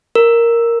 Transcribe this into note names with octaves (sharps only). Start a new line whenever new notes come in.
A#4